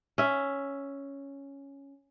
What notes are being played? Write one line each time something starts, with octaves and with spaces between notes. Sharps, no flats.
C#4 E5